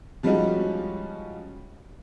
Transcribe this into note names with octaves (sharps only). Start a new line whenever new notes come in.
F3 G3 G#3 C#4 D#4 F#4